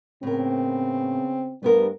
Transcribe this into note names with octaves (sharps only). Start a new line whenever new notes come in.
A2 C#3 B3 C4 A#4
G2 A3 B3 A#4